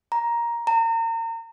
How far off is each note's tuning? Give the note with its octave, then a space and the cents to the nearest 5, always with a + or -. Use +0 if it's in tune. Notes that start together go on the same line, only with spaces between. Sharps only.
A#5 +10
A#5 -35